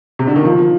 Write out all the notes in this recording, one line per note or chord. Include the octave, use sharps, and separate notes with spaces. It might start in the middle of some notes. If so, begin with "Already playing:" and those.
C3
D3
D#3
F3